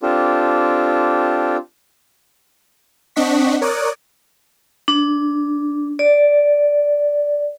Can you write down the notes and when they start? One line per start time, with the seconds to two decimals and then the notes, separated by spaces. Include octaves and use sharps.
0.02 C4 D4 F4 G4 A4
3.16 C4 D4 D#5 F#5 C#6 B6
3.61 A#4 C#5 D5 D6 D#6 F#6
4.88 D4
5.99 D5